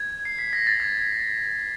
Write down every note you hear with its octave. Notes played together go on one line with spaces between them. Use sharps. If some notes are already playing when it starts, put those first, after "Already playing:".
Already playing: G#6
C7
B6
A#6
A6
G#6